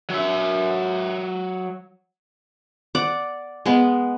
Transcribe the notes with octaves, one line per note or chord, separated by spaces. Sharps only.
F#3 E5
D5 F#5 D6
G#3 B3